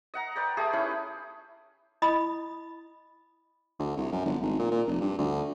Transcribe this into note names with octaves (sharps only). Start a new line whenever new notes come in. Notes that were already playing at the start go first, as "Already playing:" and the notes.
D#5 F#5 A#5
B4 D5 G5 A#5
A3 G4 G#4 D#6
C#4 D#4 E4 B4
E4 D#5 B5 D#6
D2
C2
F#2
G1
G#1
A#2
A#2
F1
G2
D2